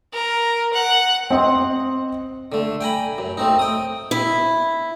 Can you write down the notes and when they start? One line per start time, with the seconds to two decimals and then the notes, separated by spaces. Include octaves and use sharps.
0.13 A#4
0.73 F#5
1.31 C4 D#5 C6
2.52 D3 A3
2.81 G5 G#5 A#5 B5
3.18 F#2
3.37 A3 C4 D#4
3.59 G5 D#6
4.11 E4